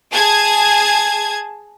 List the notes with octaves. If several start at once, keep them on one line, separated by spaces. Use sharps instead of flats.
G#4 A5 G#6